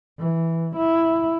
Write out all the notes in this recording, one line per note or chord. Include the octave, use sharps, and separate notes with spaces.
E3
E4